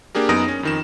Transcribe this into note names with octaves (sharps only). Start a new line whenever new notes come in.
A#3 D4 G4 G#4 A#4
F#2 B3 D#4 D#6 A#6 D7
C#4
F2 D#3 E7